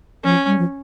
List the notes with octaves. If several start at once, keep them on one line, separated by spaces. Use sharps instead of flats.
F3 C#4
G3
F3